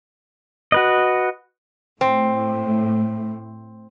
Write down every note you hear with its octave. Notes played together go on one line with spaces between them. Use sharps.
F#4 B4 D#5
A2 C4